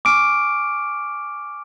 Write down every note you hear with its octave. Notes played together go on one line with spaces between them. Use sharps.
G#5 C#6 D6 F6 D7